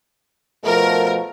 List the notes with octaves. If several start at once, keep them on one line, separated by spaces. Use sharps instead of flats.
B2 F3 A3 A#4